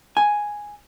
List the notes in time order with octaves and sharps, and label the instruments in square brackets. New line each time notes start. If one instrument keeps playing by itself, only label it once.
[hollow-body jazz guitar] G#5